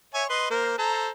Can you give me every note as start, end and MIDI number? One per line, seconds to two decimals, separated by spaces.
0.14 0.24 73
0.14 0.24 76
0.14 0.24 80
0.29 0.48 71
0.29 0.48 75
0.29 0.48 84
0.50 0.78 58
0.50 0.78 70
0.50 0.78 72
0.78 1.09 69
0.78 1.09 72
0.78 1.09 82